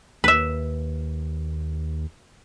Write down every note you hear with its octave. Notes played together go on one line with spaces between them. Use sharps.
D#2 B4 E5